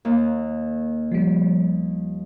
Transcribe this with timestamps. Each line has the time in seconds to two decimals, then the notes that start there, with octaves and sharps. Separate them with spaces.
0.05 D#2 A#3
1.12 F3 G3